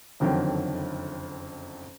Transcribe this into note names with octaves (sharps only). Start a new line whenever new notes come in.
F#1 F2 D3 D#3 F#3 G5